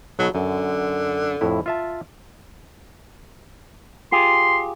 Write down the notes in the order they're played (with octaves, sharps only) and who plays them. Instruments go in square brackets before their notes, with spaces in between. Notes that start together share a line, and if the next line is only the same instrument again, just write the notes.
[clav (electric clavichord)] B1 B2 [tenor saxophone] F#3
[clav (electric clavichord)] F#2 [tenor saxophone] D3
[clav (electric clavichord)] F2 A2 E4
F4 E5 A5
[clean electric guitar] F4 G4 G#4 [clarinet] C6